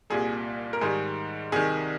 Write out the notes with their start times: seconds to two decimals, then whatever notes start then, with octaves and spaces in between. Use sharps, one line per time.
0.10 C2 A#2 G3 G#4
0.73 A#4
0.81 G#2 D#3 G3 G#4
1.52 C2 C3 D#3 G#4